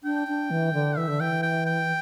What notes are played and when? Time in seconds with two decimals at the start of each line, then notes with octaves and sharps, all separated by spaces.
0.04 D4 G5
0.28 D4
0.51 E3
0.73 D3
0.97 E3 E5
1.08 D3
1.20 E3 G5
1.43 G5
1.66 G5